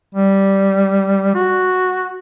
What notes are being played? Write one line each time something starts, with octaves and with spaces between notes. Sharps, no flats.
G3
F#4